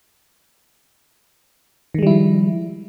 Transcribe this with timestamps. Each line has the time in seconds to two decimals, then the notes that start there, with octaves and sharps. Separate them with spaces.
1.94 D#3
1.99 G#3
2.03 G3
2.07 E4
2.11 F3